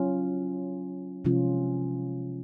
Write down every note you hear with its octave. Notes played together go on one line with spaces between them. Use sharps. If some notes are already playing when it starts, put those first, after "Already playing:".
Already playing: F#3 C#4 F4
C3 F3 G#3 C#4 F4